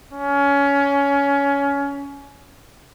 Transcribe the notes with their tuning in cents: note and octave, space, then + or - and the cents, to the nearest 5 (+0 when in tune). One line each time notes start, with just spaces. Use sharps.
C#4 +20